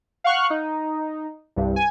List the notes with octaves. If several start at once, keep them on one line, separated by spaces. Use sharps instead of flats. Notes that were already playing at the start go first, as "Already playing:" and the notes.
F5 F#5 C#6 F6 F#6
D#4
C2 G2
G#5